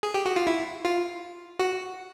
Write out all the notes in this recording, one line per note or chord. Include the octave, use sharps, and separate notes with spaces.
G#4
G4
F#4
F4
E4
F4
F#4